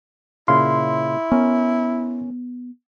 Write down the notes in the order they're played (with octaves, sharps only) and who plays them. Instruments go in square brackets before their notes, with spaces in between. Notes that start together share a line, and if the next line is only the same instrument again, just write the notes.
[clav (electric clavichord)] A#2 C#3 F5 [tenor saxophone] E4 [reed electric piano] C6
[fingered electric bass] B3 [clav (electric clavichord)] C#4 A#4